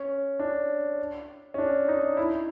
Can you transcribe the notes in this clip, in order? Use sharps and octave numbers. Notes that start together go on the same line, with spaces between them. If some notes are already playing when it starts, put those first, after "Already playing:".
Already playing: C#4
D4
C#4
D4
D#4
E4